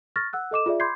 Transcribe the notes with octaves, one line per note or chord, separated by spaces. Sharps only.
C#6 F6 A6 A#6
F#5 E6 F#6
A4 D#5 D6 E7
F4 G#4 D5 E5
B5 C6 D6 G6 G#6 C7